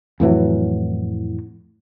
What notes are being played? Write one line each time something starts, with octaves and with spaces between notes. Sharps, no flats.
F2 A2 E3 F#3